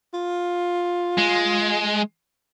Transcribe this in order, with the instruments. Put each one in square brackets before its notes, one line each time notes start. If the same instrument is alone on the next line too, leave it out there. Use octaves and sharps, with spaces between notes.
[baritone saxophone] F4
[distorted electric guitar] G#3